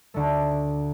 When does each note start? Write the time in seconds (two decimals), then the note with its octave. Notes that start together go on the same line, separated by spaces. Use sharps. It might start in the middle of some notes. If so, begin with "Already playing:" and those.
0.14 D2 D3 A3